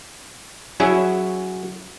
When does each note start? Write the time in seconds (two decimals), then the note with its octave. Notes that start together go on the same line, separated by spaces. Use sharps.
0.80 F#3 C#4 E4 G#4 E5